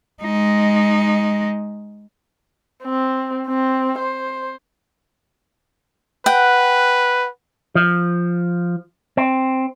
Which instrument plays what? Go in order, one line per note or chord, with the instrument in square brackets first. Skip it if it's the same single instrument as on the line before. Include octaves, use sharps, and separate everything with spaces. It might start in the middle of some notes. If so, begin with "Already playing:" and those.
[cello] G#3 D#4
[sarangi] C4
C4
C5
[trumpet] B4 [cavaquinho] F#5 G5
[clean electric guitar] F3
C4